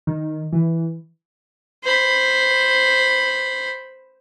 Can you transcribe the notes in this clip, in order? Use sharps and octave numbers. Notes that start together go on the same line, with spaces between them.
D#3
E3
C5 B5